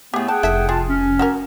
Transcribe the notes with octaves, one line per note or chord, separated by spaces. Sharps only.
A2 A3 B3 G4 G#4
G#4 F#5 G5 A5
F1 E4 A4 E5
F4 G#4 A5
C#4
F#4 G4 A#4